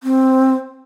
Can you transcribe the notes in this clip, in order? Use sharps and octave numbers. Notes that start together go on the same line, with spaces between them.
C4